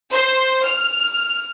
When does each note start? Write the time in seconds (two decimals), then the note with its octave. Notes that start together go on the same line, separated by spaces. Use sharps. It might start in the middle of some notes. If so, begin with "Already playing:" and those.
0.12 C5
0.67 F6